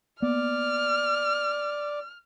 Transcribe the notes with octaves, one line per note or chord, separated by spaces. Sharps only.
A#3 B3 D5 F6